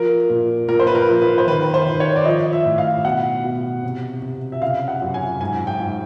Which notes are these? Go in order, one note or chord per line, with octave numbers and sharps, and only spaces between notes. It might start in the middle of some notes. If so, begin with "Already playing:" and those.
Already playing: F3 A#4
A#2
A#2 A#4
C5
B4
A#4
F3
B4
C5
D#3 B4
C5
D#3
C#5
D5
F3 D#5
E5
A2
F5
B2 F#5
B2
C3
C3
E5
C#3 F5
F#5
F#2
G#5
G#2 G#5
G5
G#2